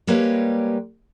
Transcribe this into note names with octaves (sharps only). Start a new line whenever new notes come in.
G3 G#3 A#3 G4 B4 C#5